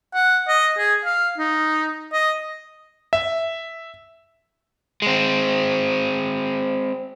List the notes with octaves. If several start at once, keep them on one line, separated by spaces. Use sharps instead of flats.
F#5
D#5
G#4
F5
D#4
D#5
E5
G#3 C4